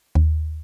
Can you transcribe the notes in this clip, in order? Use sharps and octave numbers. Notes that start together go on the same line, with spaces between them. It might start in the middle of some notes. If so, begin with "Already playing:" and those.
D#2